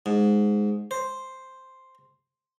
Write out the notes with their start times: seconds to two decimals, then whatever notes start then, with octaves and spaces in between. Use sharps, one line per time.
0.06 G#2
0.91 C5